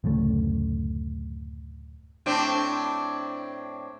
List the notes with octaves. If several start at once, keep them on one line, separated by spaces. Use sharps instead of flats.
D1 F#2 C#3 A3
A2 C4 D4